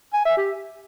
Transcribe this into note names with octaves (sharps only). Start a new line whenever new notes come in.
G#5
E5
G4